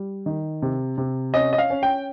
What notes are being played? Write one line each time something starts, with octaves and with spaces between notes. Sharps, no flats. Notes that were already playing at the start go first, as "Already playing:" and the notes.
Already playing: G3
D#3
C3
C3
C#4 D#5
D#5
F5
C#4
G5